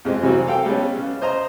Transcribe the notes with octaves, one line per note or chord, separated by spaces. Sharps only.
F2 G#3 C4
C3 E3 F#3 G3 C4 F#4
A4 F5 G5 E6
G3 G#3 B3 C#4
C#3
C5 D#5 A#5